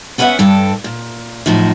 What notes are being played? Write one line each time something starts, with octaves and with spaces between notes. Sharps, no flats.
B3 C#4 B4 C#5 E5 F#5
G2 A4 G5
A#2
F#2 A2 F3 D#4